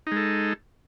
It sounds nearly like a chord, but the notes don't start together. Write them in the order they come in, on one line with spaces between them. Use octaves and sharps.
D#4 G#3 A4